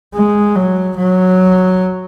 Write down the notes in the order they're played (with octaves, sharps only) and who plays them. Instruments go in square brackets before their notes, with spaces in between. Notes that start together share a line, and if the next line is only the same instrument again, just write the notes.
[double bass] G#3
F#3
F#3